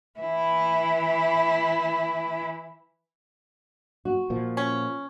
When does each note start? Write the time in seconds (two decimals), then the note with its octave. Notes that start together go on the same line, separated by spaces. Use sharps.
0.19 E3 E4
4.05 F#4
4.30 A#2 F3
4.57 C#4